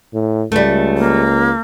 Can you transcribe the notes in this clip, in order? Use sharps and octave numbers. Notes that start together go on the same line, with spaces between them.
A2
C#2 G3 A3
A#3